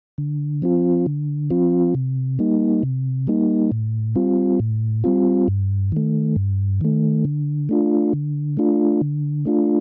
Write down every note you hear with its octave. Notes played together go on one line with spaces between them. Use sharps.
D3
F3 C4 F4
D3
F3 C4 F4
C3
G3 A#3 D#4
C3
G3 A#3 D#4
A2
G3 C4 F4
A2
G3 C4 F4
G2
D#3 A3
G2
D#3 A3
D3
A3 D4 F4
D3
A3 D4 F4
D3
A3 D4 F4